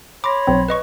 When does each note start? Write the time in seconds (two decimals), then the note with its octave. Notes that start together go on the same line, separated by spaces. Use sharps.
0.24 C#5 B5 C6 D6 A#6
0.47 B1 C4
0.68 B4 D#5 C#6